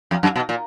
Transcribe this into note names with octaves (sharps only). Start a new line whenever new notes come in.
F2
F#2
B2
A#2